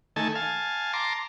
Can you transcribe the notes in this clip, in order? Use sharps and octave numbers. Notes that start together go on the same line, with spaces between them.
D#3 A3 G#5 A5
F5 G#5 A5
A5 A#5 C6 D6